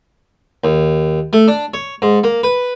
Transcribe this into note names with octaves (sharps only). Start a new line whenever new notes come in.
D#2
A3
D4
C#5
G#2
A#3
B4